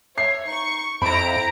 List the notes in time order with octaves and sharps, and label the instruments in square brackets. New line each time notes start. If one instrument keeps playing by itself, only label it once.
[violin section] C#5 [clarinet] E5 [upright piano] C7
[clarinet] D#4 [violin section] C#6
[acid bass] F2 [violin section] E4 A#5 D7 [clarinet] C5 [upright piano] B5